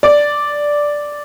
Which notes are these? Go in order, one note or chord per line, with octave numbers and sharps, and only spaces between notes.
D5